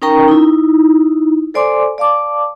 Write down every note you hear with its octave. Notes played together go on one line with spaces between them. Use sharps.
C#4 D#4 A#4 G5 A#5 C#6
D#4 E4
A4 C5 D5 G#5 C6 D6
D5 F5 A5 D6